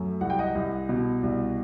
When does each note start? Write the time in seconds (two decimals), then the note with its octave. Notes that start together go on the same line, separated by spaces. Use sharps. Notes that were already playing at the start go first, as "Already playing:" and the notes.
Already playing: F#2 A3
0.21 C2 F#5
0.30 G5
0.39 D#5 F#5
0.55 C2
0.89 B2
1.23 C2